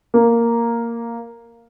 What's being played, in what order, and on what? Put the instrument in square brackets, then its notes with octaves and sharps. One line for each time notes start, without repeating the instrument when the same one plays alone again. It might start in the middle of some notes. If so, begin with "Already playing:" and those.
[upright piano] A#3